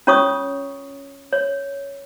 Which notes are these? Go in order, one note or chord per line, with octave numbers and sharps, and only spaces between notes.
C#4 F4 C#5 C#6 D#6
C#5